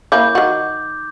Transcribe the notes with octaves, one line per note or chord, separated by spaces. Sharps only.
A#3 C#4 E4 D6 G6
D#3 F#4